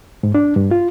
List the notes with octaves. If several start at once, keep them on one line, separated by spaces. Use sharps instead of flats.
G#2
D4
G2
F4